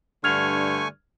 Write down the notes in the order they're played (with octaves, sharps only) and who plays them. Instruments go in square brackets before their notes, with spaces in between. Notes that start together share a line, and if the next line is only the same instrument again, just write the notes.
[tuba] G2 [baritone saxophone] D3 [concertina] A3 G#5 C#6 [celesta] F6 G#6 F7